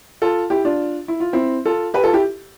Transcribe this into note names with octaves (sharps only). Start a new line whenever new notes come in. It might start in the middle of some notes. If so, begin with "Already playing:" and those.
F4 A4
E4 G4
D4 F4
E4
F4
C4 E4
F4 A4
G4 B4
F4 A4
E4 G4